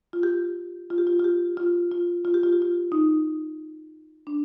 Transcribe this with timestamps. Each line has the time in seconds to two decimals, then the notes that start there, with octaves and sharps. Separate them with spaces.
0.13 F4
0.23 G4
0.90 F4
0.98 G4
1.07 F4
1.19 F4
1.24 G4
1.57 F4
1.91 F4
2.25 F4
2.34 G4
2.43 F4
2.52 G4
2.62 F4
2.92 D#4
4.27 D4